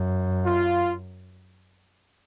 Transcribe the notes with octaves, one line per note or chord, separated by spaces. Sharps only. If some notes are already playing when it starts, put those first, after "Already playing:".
Already playing: F#2
F4